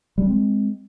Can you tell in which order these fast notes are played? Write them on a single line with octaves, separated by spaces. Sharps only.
G3 D4 C4 G#3